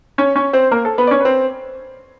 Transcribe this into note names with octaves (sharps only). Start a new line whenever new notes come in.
C#4 C#5
C#4 C#5
C4 C5
A#3 A#4
A4
B3 B4
D5
C#4 C#5
B4
C4 C5